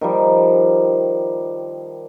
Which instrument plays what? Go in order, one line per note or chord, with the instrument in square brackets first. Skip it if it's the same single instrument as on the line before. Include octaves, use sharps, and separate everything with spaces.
[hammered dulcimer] D#3 F3 G3